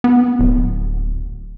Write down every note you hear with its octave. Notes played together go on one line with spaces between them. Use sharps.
B3
D1